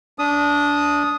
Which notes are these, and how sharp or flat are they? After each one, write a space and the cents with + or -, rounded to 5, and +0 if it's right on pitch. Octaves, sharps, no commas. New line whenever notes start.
D4 -20 D#6 +0